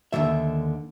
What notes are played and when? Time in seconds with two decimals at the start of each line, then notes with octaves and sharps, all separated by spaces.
0.13 D#2 D3 D#3 E5